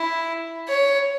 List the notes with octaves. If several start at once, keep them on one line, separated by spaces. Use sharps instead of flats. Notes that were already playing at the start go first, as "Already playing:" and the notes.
Already playing: E4
C#5